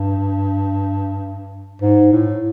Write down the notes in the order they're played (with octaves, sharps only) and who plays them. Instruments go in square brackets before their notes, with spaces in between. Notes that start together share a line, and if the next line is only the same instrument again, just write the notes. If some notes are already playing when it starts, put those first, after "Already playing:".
Already playing: [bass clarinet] G2
G#2
A2